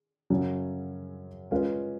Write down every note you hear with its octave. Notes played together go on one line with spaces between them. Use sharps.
F#2 C#3 F#3 C#4
G#3 C#4 F4 B4 F5